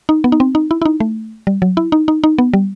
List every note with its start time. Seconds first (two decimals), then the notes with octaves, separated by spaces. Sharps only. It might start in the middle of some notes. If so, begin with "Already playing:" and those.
0.09 D#4
0.24 B3
0.32 D#4
0.40 C4
0.55 D#4
0.71 E4
0.82 E4
0.86 D#4
1.00 A3
1.47 G3
1.62 F#3
1.77 E4
1.92 D#4
2.08 D#4
2.24 D#4
2.38 B3
2.54 G3